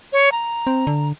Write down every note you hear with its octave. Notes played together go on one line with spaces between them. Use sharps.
C#5
A#5
C4
D3